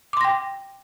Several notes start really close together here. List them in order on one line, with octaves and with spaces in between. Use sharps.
D6 C6 A#6 G5